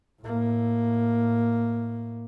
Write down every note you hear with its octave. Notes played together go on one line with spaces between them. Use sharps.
A2 A#3